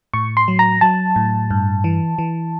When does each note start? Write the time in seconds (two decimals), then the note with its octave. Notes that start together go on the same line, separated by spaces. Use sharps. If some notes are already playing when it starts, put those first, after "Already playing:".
0.14 A2 C#6
0.37 C6
0.48 F#3
0.59 A#5
0.81 F#3 A5
1.16 A2
1.51 G2
1.84 E3
2.18 E3